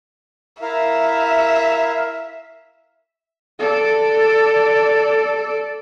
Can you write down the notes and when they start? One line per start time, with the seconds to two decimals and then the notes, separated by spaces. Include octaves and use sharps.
0.62 E4 A#4 E5 F5
3.59 A4 D5